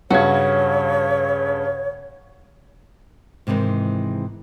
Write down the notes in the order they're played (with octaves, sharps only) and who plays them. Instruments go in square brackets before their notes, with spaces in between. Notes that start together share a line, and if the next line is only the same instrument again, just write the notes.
[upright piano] G2 C#3 G#6 [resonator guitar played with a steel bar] F#4 [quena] C#5
[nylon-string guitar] G#2 C3 D#3 E3 G#3